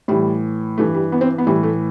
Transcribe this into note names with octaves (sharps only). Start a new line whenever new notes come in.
A2 E3 G3
G2 E3 A3
G3
B3
C4
B3
A2 E3 G3
A3